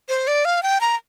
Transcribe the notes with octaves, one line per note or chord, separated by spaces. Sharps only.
C5
D5
F5
G5
A#5